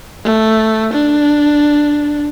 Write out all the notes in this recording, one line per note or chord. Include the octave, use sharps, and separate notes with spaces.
A3
D4